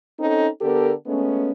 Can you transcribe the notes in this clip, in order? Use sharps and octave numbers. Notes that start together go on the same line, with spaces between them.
C4 C#4 D#4 A4
D3 B3 G4 A4 A#4
G#3 A3 B3 C#4